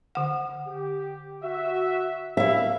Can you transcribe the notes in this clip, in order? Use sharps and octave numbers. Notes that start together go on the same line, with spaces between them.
D3 F#5
G4
F#4 E5
F#3 A#3 E4 E5 F5